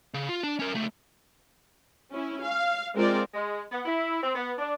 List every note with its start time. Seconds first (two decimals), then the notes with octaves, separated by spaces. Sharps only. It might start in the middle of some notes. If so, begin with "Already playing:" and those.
0.14 C#3
0.29 F4
0.43 D4
0.59 C#4 A#4
0.74 C#2 A3
2.12 C#4 E4
2.43 F5
2.94 G#3 C4 F4 A#4 D5
3.34 G#3
3.72 B3
3.86 E4
4.23 C4
4.35 B3
4.58 D4